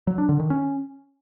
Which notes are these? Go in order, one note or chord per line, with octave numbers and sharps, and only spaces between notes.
F#3
D4
D3
D#3
C#4